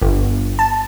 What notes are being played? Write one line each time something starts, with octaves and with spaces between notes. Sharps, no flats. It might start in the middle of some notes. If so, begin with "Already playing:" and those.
G1
A5